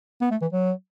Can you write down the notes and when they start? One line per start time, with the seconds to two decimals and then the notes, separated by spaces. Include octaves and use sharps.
0.21 B3
0.31 A3
0.41 E3
0.52 F#3